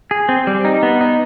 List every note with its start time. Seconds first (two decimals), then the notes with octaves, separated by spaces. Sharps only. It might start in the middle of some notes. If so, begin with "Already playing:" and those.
0.11 G#4
0.29 C4
0.47 G3
0.65 D#4
0.83 B3
1.01 D#4